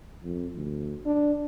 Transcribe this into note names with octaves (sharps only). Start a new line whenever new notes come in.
F2
D2
D4